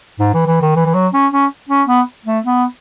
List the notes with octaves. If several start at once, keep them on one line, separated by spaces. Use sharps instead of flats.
G#2
E3
E3
D#3
E3
E3
F#3
C#4
C#4
C#4
B3
A3
B3